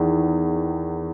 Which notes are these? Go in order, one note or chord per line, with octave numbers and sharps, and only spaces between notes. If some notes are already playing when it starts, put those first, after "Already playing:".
Already playing: E2 D#3